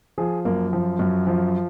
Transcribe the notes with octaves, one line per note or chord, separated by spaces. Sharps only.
F3 G#4
F#2 A#3
F3
F#2
F3